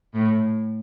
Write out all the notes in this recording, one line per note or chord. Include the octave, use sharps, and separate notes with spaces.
A2